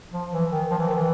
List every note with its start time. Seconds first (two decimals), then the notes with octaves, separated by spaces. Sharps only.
0.12 F3
0.32 E3
0.50 D#3
0.70 F3
0.78 E3
0.87 D#3
0.95 E3